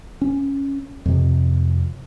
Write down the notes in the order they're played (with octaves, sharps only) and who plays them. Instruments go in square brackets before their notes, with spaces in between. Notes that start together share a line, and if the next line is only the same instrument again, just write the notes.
[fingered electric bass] C#4
F2 C3